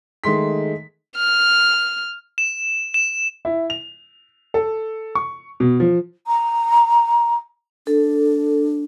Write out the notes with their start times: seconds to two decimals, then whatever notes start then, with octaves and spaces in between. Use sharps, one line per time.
0.24 D#3 G#3 A3 C6 B6
1.16 F6
2.38 E7
2.94 E7
3.45 E4
3.70 F7
4.54 A4
5.15 C#6
5.60 B2
5.80 F3
6.27 A#5
7.87 D4 A4